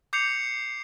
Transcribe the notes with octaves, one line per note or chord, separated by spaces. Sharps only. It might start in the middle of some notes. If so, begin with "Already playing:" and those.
D6 G6 C7 C#7 F7